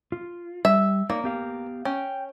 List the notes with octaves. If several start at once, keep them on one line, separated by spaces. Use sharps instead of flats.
F4
G3 E5
A#3 D#4 C#5 D5
B3 G4 F5
C#4 G5